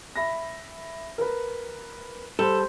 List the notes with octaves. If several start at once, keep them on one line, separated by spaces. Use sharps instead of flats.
E5 B5 A#6
A#4 B4
G3 A4 C5